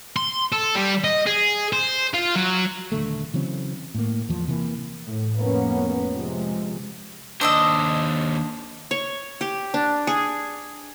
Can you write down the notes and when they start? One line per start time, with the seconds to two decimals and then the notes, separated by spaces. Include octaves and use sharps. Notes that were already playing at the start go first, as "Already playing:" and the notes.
0.16 C6
0.52 A4
0.75 G3
1.04 D#5
1.27 G#4
1.73 C5
2.14 F4
2.36 F#3
2.92 D#1 D3 A3
3.34 C#3 E3 F#3 C4
3.95 A2 A#3
4.29 E2 F3
4.47 C3 E3 A#3
5.06 A2
5.38 F1 A#3 B3 C#4
6.12 C3 F3 G#3
7.41 D#2 D4 C5 D#5 E6
8.91 C#5
9.41 G4
9.74 D4
10.07 G#4